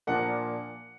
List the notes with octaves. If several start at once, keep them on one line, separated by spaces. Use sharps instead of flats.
A#2 F3 A#3 D4 F#5